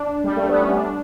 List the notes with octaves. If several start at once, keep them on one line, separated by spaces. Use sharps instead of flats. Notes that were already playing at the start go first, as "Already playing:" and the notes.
Already playing: D4
G3
A3
B3
C#4
D4